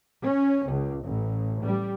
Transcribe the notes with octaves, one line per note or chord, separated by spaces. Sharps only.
C#4
C#2
A1
G3